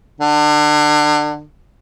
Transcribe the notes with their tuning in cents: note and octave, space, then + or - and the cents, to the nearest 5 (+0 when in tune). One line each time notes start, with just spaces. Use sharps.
D3 +30